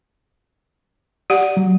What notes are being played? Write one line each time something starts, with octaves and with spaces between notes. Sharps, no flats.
G4 D5 F#5
F#3